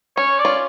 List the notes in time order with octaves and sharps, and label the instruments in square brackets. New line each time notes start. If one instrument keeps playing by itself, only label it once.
[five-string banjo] C#4 [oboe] C#5
[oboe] D5
[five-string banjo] C#4 F4